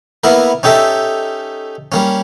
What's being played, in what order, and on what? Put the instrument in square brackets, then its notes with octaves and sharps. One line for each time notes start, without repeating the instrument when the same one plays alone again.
[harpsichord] A#3 B3 E4 A#4
C#4 D#4 G4 A4 E5
G3 A#3 C#4